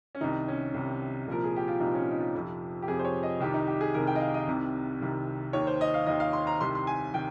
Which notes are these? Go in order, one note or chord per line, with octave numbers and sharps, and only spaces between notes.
C#4
C2 C3 D#3 D#4
C#4
C2 C3 D#3
C2 A#2 F3 A#4
G#4
G4
F4
C2 A#2 F3 D#4
C#4
D#4
F4
F2 C3 F3
G4
F2 C3 F3 G#4
C5
C#5
D#5
C2 C3 D#3 G4
D#4
G4
G#4
C2 C3 D#3 A#4
G5
D#5
F5
D#5
C2 C3 D#3
C2 C3 D#3
D#2 D#3 C#5
C5
D#5
F5
D#2 D#3 D#5
F5
C6
A#5
C2 C3 D#3 C6
C6
G#5
C3 D#3 G5